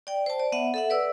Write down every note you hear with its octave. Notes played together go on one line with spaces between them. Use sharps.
D5 G5
C5 A5
D5
B3 E5 F#5
A4 E5 F#5
B4 D5 E6